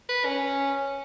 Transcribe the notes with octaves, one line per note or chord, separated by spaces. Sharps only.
B4
C#4